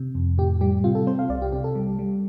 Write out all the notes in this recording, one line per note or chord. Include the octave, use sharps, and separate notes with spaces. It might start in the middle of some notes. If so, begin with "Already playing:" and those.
Already playing: C3
F2
A2 G4
G3 G4
C3 F4
A4
C4 C5
F5
C2 D5
G4
C3 G4
A4
G3
G3